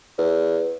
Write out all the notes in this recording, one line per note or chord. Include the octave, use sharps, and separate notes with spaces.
E2